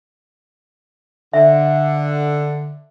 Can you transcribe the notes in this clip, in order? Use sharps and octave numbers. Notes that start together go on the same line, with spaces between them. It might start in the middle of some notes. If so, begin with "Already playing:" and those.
D3 E5